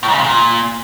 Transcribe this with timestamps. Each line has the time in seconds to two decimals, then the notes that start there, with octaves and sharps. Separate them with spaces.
0.03 A2
0.08 G#2
0.13 C#3
0.19 C3
0.24 A#2